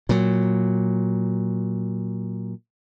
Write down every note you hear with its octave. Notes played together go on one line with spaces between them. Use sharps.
A#2 F#3